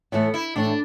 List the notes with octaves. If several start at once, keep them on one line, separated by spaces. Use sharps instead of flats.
A2 E3 A3 B3
E4
A2 E3 A3 D4